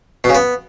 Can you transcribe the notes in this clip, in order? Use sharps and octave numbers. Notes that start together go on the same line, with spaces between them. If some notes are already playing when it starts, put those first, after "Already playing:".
B2
C#3
B3